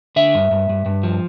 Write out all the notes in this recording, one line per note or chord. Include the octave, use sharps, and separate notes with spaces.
D3 E5
G2
G2
G2
G2
F3